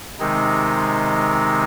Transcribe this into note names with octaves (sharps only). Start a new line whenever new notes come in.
C3 D#3 G#3 C4 D#4